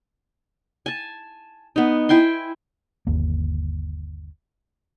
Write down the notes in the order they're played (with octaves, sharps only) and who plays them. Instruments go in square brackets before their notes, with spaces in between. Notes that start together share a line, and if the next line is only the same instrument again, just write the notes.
[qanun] G#5 A5
B3 D#4
E4 G5 G#5 C6
[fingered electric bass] G1 D#2 A#3